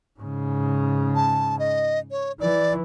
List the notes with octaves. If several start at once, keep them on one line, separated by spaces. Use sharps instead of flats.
G#2 C#3
A5
D#5
C#5
E3 D5